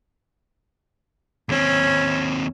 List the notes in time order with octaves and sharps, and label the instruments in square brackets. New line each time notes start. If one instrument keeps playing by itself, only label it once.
[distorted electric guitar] D#2 C4 [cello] C#4